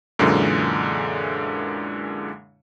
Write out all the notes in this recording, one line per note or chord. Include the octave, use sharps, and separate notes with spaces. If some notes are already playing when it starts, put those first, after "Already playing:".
F#2 A#2 D3 E3 G#3